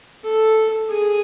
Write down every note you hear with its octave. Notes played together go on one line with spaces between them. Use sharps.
A4
G#4